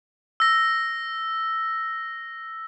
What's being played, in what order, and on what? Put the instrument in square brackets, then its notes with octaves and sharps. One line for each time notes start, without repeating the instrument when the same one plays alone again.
[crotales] E6 A#6